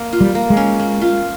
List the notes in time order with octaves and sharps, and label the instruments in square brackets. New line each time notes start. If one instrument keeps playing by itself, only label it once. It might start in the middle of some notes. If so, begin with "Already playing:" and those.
Already playing: [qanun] A#3
F4
[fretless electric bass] G3
[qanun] A#3
[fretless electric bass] G#3
[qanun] C#4
A#3
F4